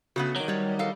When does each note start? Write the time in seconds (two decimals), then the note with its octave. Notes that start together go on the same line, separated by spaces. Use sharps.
0.16 C#3 A3 B3 F#4
0.36 D#3 F#3 D6
0.48 G3 C#5 D5
0.79 A4 D#5 F5